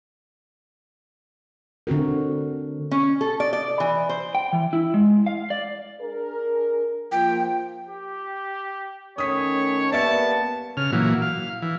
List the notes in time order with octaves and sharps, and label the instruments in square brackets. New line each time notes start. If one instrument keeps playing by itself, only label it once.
[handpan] D3 C4 F#4 A#4
[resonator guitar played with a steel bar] C#4
A4
D5
D5
E3
C5
[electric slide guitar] G5
E3
E4
G#3
F5
D5
[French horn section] D4 G#4 A#4
[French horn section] F3 A#3 F4 [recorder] G5
[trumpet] G4
[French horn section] D#3 A3 C#4 [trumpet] C#5 [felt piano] D#6 B6
[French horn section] G3 A#3 B3 [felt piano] D5 E5 C#7 [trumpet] A5
[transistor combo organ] C#3 F6
A#2 E3 F#3
F5
E3